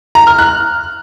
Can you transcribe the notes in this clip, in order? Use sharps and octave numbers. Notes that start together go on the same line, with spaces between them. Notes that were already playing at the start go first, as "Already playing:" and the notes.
A#5
F6
F#6